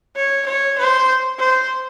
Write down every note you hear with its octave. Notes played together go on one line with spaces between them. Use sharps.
C#5
C#5
C5
C5